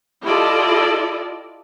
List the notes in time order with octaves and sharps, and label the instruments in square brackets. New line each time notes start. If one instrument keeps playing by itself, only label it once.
[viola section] E4 F4 G4 A4 D5 D#5